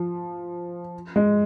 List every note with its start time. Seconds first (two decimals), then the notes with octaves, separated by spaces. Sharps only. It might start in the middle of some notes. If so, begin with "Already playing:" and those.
Already playing: F3
1.16 G#3